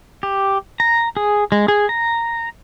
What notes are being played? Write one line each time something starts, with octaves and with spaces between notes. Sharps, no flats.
G4
A#5
G#4
G#3
G#4
A#5